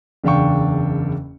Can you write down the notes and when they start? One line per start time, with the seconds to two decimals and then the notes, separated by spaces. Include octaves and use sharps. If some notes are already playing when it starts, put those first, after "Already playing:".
0.24 F#1 E2 D4 F5 G5 C#6